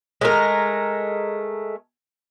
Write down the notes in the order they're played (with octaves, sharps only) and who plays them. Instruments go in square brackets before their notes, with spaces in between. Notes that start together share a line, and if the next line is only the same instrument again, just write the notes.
[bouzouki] G#3 A3 A#4